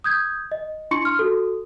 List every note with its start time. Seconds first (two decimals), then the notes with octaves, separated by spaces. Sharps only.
0.04 D#6 G6 G#6
0.52 D#5
0.91 D4 E4 C6 C#6 C#7
1.05 C6 F6
1.19 F#4 A4